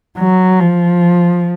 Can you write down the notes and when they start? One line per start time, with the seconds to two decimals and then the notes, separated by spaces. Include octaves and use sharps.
0.18 F#3
0.60 F3